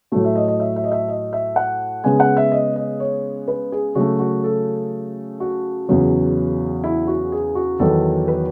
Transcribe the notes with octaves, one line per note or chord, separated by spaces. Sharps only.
A2 F#3 A3 F#4
E5
D#5
D#5
E5
E5
D#5
E5
D#5
E5
F#5
C#3 G#3 B3 G#5
F#5
E5
D#5
D#5
C#5
B4
G#4
C#3 F#3 A3 F#4
F#4
A4
F#4
E2 C#3 F#3 B3
E4
F#4
G#4
F#4
E2 D#3 F#3 B3 A4
B4